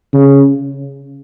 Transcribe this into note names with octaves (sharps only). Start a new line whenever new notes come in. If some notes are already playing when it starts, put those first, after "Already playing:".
C#3